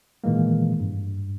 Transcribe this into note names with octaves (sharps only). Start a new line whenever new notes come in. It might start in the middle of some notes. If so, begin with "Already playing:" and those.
A#2 D#3 E3 G#3 A#3
G2